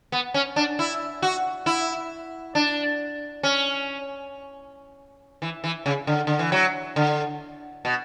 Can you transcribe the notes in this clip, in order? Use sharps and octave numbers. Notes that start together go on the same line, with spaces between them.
B3
C#4
D4
E4
F#4
E4
D4
C#4
E3
E3
C#3
D3
D3
E3
F#3
D3
B2